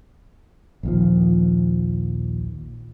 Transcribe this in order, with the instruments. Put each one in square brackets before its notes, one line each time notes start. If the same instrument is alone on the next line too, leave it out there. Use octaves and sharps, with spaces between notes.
[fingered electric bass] A#1 D#2 F3